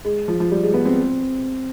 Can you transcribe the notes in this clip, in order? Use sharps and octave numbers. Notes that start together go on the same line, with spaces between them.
G#3
F3
F3
G3
G#3
B3
C4